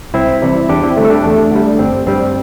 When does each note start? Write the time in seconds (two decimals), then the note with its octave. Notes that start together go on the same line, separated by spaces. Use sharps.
0.14 C2 C4 E4
0.42 C3 E3 G3
0.69 E2 D4 G4
0.83 C4 E4
0.97 D3 G3 A3 D4
1.05 A4
1.10 D4 G4
1.24 E2 A3 D4
1.51 D3 G3
1.79 G1 C4
2.07 G2 G3 C4